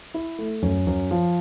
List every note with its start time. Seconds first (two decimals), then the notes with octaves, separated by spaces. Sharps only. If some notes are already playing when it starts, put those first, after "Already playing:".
0.14 E4
0.39 A3
0.62 F#2
0.87 F#2
1.11 F3